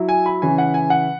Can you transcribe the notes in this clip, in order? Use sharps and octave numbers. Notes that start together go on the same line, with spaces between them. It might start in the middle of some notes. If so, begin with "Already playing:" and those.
Already playing: F#3 E4
G#5
B5
C#3 E3 C#4 G#5
F#5
G#5
F#5